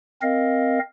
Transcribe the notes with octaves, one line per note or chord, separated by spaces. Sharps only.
C4 A#4 D#5 F5